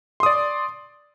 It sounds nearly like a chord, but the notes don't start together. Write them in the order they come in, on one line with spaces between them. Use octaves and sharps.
C6 D#6 D5